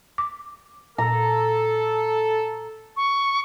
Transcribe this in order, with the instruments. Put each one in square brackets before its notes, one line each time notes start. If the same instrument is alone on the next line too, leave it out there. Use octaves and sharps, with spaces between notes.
[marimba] D6
[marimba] A#2 [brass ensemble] A4 [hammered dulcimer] A#5
[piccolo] C#6